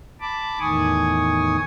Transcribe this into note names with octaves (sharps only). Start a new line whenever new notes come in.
A5 B5 D6
E2 A2 D#3 G#5 C#6 D#6